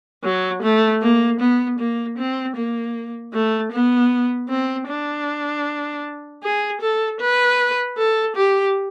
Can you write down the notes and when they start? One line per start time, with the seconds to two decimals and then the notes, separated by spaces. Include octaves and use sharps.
0.24 F#3
0.63 A3
1.02 A#3
1.40 B3
1.79 A#3
2.18 C4
2.56 A#3
3.33 A3
3.72 B3
4.49 C4
4.88 D4
6.43 G#4
6.81 A4
7.20 B4
7.97 A4
8.36 G4